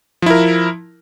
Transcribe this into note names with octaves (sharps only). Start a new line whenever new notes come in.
F3 E4 A#4